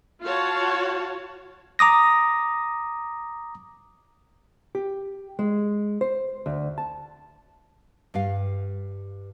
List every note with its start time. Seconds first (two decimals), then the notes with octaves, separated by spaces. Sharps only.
0.23 F4 F#4 C#5 A5
1.79 A#5 D6 D#6 A#6
4.75 G4
5.39 G#3
6.01 C5
6.46 D2
6.78 A5
8.14 G2 G4 F5